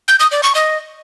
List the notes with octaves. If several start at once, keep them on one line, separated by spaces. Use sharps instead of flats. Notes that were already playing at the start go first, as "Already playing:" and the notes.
G6
D#6
D5
C#6
D#5